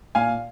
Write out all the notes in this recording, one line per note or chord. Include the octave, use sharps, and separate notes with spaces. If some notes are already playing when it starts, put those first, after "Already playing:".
A#2 F5 G#5